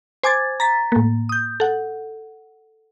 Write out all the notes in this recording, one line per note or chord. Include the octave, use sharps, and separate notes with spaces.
C5 G#5 D6 G#6 A6
A#5 A6 B6
A2 A#3
D#6 G6
A4 F#5